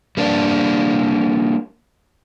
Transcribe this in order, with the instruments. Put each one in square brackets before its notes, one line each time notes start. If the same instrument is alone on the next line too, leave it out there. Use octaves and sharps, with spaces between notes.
[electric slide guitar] G3 A#3 D4